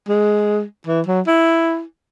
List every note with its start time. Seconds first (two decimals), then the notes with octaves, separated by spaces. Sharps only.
0.08 G#3
0.87 E3
1.07 F#3
1.27 E4